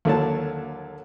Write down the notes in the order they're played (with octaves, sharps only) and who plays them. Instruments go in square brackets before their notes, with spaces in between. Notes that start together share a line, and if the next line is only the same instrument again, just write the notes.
[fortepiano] D#2 D3 F#3 A5